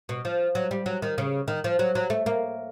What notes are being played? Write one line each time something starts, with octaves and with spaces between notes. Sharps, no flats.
B2
F3
F#3
G3
F#3
D#3
C#3
D#3
F3
F#3
F#3
A3
A#3